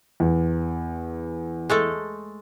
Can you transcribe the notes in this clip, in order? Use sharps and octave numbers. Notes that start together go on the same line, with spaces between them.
E2
G#3 A3 A4